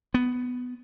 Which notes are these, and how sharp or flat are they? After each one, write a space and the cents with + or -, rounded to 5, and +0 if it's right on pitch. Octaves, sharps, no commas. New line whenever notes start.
B3 +10